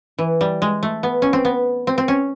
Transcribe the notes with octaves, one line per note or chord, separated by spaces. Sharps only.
E3
G3
G#3
A3
B3
C#4
C4
B3
C4
C4
C#4